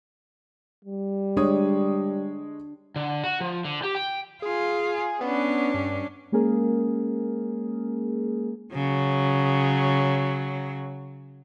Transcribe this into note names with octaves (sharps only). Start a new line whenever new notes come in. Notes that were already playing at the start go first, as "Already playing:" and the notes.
G3
G#3 D4 C#5 D#6
D3
F#4
F3
D3
G4
G5
F4 G#4
B3 C#4 D4
G2
G#3 A#3 C#4 G#4 A#4
C#3 F#3